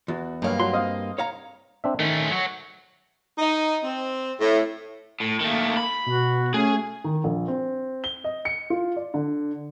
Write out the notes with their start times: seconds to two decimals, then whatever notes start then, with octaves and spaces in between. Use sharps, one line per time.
0.08 E2 F#4
0.42 B1 G2 A#3 C#5 F5
0.60 F#3 F#4 C6
0.72 C4 D#5 F5
1.18 C#5 F5 A#5
1.84 C4 D4 E5
2.00 D#3 A3 C#4
2.31 F#3 C#5
3.38 D#4
3.84 C4
4.40 A2
5.20 A2
5.40 D#3 A3 A#3
5.77 B5
6.06 B2 F#4
6.54 A3 C#4 G#4
7.04 D#3
7.24 A#1
7.48 C4
8.04 G7
8.24 D#5
8.45 C#7
8.70 F4
8.96 D5
9.14 D3